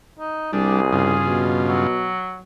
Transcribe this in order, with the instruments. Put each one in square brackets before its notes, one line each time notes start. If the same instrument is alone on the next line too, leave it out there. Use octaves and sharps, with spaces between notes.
[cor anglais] D#4
[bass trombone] C2 [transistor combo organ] G3 D4 [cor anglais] G#4
[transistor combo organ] G2 C#3 F4
[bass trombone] B2
[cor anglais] F#3